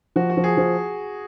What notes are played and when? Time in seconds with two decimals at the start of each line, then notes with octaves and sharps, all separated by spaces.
0.16 F3 F#4
0.30 F#4
0.37 F3
0.44 G#4
0.57 F3